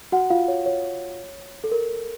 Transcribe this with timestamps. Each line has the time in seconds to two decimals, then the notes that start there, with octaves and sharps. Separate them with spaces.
0.12 F#4 F#5
0.30 F4 F5
0.48 C#5
0.66 C#5
1.64 A4
1.71 A#4